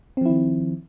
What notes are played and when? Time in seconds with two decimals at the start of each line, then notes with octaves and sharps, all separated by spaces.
0.17 C4
0.21 F3
0.25 E4
0.30 D#3